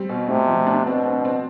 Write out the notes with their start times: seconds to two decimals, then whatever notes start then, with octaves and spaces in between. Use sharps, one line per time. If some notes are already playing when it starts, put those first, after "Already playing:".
Already playing: G3 C4
0.09 B2
0.28 A2 C3
0.48 F3
0.67 D4
0.86 B2 C4
1.06 C4
1.25 C4